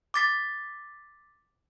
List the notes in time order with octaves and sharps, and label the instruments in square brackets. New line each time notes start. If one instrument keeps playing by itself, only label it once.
[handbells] D6 A6 B6